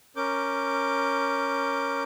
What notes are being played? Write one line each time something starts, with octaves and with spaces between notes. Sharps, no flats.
C#4 A#4 D6 G6